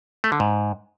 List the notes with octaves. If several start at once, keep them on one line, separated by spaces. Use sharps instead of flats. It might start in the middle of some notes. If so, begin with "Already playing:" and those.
A3
D3
G#2